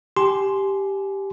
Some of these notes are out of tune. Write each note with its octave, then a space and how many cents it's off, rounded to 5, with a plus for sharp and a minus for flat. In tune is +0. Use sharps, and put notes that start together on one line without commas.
G4 +0 G#5 +25 C6 +0